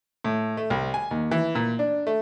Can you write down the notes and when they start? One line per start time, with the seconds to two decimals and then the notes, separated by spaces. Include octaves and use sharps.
0.24 A2
0.57 A3
0.70 C2
0.94 G#5
1.11 D#2
1.31 E3
1.55 A#2
1.79 D4
2.07 A3